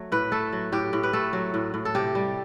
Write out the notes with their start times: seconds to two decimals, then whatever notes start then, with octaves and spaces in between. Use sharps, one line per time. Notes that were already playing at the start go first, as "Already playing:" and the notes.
Already playing: F#3 A3
0.12 A2 B4
0.32 A3 A4
0.53 F#3
0.72 A2 G4
0.93 A2
1.03 B4
1.13 A3 A4
1.33 F#3
1.54 A2
1.74 A2
1.85 A4
1.95 C3 G4
2.15 G3